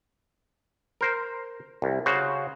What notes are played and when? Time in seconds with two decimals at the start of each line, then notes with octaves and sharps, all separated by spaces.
1.01 A#4 C5
1.82 C2
2.06 C#3 F#4 C5